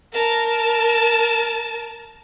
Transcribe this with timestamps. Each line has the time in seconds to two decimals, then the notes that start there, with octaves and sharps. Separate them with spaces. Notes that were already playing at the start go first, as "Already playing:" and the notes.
0.13 A#4 A5